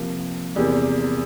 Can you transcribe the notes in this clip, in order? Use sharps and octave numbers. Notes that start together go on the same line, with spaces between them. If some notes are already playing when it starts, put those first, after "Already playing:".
Already playing: C3 F3 A#3
E2 C3 G3 A#3